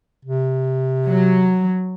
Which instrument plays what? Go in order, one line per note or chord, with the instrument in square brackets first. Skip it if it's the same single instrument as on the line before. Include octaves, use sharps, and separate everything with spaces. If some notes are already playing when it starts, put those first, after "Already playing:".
[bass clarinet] C3
[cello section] F#3